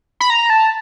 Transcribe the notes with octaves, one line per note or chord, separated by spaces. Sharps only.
B5
A#5
A5